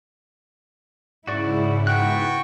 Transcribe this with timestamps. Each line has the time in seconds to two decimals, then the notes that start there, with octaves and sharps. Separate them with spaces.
1.27 G#2 C#3 E4 F#4 D5 C#6
1.87 B3 F#4 G5 C#6 F#6